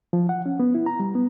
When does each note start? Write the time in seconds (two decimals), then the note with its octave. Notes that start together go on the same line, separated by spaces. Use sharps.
0.13 F3
0.29 F#5
0.46 C#4
0.60 B3
0.75 E4
0.86 A#5
1.00 G3
1.15 B3